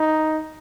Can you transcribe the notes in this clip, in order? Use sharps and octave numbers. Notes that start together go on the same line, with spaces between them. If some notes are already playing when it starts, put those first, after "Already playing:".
Already playing: D#4